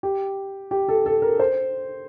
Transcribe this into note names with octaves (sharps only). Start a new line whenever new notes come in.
G4
G4
A4
A4
A#4
C5